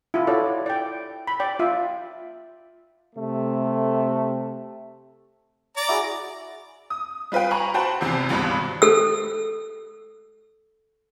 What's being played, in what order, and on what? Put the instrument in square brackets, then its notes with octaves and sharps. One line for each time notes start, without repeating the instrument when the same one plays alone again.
[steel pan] E4 F4
F4 F#4 A4 C#5 D5
D5 G5
B5
D5 G5
F4 E5
[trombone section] C3 A3
[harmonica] D5 A#5 D6
[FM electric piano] E4 F#4 G#4
[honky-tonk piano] D#6
G3 F4 B4 F5 G5
G#5 A#5 B5 C#6
F#4 C5 G5 A5 B5
G#1 E2 C3
G#1 C#2 G2 B2 E3
[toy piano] A4 E6